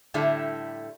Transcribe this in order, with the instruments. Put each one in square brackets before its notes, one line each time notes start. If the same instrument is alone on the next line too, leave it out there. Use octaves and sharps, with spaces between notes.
[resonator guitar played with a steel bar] A2 D3 G3 A3 E4 A4